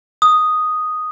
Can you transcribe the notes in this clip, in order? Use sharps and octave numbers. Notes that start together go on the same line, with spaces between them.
D#6